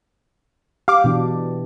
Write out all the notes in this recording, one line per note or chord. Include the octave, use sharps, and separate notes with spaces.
G4 F5 D6
B2 E3 D4